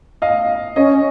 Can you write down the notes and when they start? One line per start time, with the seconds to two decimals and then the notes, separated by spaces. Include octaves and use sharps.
0.22 D#5 F5
0.76 C#4 C#5 D#5